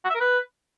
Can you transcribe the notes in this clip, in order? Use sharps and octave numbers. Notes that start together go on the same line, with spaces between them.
F#4
E5
A#4
B4